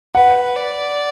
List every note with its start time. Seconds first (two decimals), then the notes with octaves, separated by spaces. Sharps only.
0.15 B4 F#5
0.56 D5